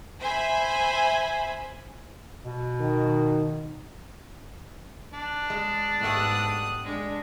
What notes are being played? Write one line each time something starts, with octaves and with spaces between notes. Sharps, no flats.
C5 E5 G#5 B5
B2
D#3
D4
G#3
G#2 G3 A3 B3 D#6 F#6
G#3 D4